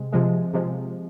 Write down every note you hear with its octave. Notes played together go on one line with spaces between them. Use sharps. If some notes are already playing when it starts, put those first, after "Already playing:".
Already playing: C3 G#3
C3 F3 G#3
C3 F3 G#3